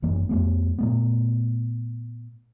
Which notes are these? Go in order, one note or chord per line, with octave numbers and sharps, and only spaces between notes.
G1 F#2 E3 A#3
F2 A3 B3
A#2 A3 B3